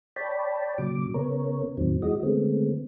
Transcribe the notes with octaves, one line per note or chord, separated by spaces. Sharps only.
C#5 D5 G5 A5 B5
A#2 C#3 F#3 D6
C#3 B3 A#4 C#5
E2 A2 D#3 F#3 C4
E3 G#3 F#4 D#5
D3 G#3 A3 B3 C4